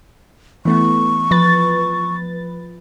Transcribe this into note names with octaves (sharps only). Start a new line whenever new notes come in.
E3 A3 B3 C#6
F3 B4 A6